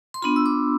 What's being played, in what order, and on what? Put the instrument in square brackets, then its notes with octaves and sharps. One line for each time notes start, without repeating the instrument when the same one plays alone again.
[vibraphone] C6
B3 D4 F4 B5
E6
D6